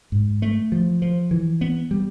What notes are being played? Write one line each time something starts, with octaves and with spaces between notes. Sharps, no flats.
G#2
A3
F3
F3
E3
B3
G3